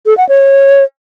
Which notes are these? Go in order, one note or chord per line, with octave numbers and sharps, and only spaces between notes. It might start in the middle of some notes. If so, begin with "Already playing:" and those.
A4
F#5
C#5